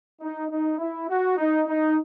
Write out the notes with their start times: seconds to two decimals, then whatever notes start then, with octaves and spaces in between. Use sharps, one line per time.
0.21 D#4
0.50 D#4
0.78 E4
1.08 F#4
1.37 D#4
1.67 D#4